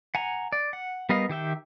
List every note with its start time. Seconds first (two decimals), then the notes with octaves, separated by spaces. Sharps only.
0.15 F#5 G#5 A#5
0.52 D5
0.73 F#5
1.09 G3 B3 A#4 D#5 F5
1.29 D#3 G4 E5 G5